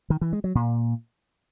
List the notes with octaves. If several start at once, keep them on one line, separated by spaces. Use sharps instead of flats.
D#3
E3
G#3
F#3
A#2